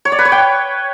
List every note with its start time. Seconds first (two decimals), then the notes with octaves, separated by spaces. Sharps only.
0.05 C#5
0.12 D5
0.19 B4
0.25 C#5
0.32 G5